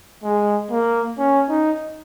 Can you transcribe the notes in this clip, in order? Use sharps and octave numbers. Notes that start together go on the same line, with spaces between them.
G#3
A#3
C#4
D#4